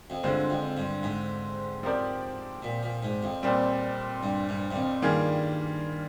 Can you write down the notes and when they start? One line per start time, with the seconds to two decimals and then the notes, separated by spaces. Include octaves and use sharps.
0.10 F2
0.23 G2 D3 G#3 C4 F4 C5
0.50 F2
0.77 G2
1.03 G#2
1.83 F3 C4 G4 A#4 D5
2.63 A#2
2.83 A#2
3.03 G#2
3.23 F2
3.43 A#2 G3 C4
4.23 G2
4.49 G2
4.71 G2
4.76 F2
5.02 G2 D#3 G3 A#3 F4 G#4